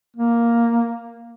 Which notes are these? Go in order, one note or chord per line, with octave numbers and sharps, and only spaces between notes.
A#3